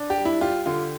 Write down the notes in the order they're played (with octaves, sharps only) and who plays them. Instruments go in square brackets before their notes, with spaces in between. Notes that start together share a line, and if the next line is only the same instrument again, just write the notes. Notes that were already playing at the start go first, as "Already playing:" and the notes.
Already playing: [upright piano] D4
[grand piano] G4
[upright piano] G3
[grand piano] E4
[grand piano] F4 [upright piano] G4
[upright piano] D3 [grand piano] F4